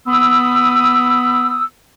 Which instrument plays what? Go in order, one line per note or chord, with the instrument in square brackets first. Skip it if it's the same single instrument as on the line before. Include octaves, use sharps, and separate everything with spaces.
[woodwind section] B3 B5 D#6 E6